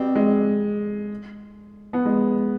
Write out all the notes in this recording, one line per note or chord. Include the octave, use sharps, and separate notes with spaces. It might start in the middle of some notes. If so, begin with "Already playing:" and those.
Already playing: B2 G3 C4
G#3
B3
G#3